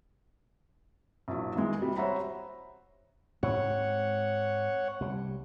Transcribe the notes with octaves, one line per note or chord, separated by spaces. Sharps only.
A#1 F#3 E4
D#3 E3 G#3
C3 G3
C5 C#5 E5 F#5 A#5 B5
G#2 C4 C#5 F#5
C2 G3